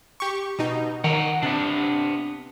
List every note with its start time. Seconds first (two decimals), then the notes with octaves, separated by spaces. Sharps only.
0.20 G4 C#6
0.59 B2 D#4
1.04 D#3 F#5 G5 A#5
1.43 C3 B3 D4